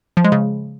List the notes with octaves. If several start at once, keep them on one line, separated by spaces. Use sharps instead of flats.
F3
G#3
C#3